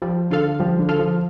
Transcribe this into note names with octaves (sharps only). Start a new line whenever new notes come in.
F3 G3
D3 F4 A4 F5
F3 G3
D3
F4 A4 F5
F3